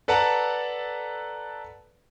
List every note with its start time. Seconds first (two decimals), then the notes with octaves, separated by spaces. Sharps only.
0.08 A4 B4 D5 F#5 A5 A#5